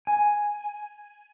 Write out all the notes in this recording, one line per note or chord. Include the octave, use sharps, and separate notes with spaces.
G#5